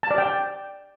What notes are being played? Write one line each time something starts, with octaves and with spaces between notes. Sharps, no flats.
A5
D5
G5